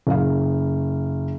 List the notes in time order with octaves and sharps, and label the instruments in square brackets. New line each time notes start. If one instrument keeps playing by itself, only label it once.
[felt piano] F#1 F5